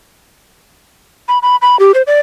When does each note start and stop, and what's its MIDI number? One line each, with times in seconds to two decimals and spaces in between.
1.28 1.39 83
1.42 1.56 83
1.62 1.79 83
1.79 1.92 67
1.94 2.02 72
2.07 2.20 74